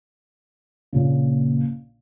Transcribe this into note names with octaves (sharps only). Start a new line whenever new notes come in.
A#1 A#2 C#3